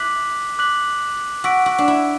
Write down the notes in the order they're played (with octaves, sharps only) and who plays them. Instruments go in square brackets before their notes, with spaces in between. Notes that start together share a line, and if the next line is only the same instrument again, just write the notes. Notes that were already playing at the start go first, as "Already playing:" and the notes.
Already playing: [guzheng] E4 [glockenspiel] D6 F#6 B6 F#7
[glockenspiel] D6 F#6 B6 F#7
[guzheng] F#4 [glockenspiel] E6 B6 D7
[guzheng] F#4
D4
E4